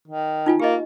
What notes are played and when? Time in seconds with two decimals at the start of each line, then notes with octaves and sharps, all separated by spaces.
0.08 D#3
0.46 D#4 F4 G#5
0.60 A#3 G4 D#5